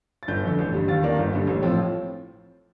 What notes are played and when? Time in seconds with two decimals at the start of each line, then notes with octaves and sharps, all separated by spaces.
0.23 A6
0.28 G1 G6
0.43 F2 D3
0.59 A1
0.73 G2 D3 G3
0.88 D#2 A6
1.03 D#3 A#3 D4
1.18 G1
1.33 G2 D3 G3
1.47 A1
1.62 A2 F3 C4